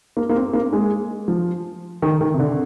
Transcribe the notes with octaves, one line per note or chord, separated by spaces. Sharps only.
A#3
A#3
C4
A#3
G#3
F3
D#3
D#3
C3
D3